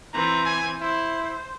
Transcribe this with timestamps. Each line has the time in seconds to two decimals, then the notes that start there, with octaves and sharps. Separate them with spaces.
0.14 E3 C4 A#5
0.46 G#5
0.81 E4 C5